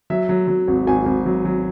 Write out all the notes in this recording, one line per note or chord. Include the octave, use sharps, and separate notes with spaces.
F#3 E5
F#3
F#3
G#1
G#1 G#5
G#1
F#3
F#3